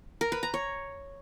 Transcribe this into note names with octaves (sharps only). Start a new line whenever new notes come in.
A#4
B4
A#5
C#5